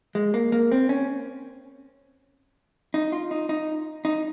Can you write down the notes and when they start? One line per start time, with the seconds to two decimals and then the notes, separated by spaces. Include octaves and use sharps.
0.15 G#3
0.34 A#3
0.52 A#3
0.72 C4
0.89 C#4
2.94 D#4
3.12 F4
3.31 D#4
3.49 D#4
4.05 D#4